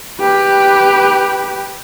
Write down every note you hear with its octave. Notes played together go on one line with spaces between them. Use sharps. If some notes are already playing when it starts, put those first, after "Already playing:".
G4 B4